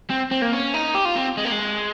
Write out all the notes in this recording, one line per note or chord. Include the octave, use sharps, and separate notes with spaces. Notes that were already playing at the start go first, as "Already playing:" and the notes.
C4
C4
A#3
C#4
D#4
G4
F4
C4
G#3
A#3
G#3